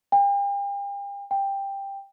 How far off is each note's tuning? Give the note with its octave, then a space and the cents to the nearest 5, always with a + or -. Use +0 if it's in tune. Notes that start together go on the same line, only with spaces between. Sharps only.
G5 +40
G5 +10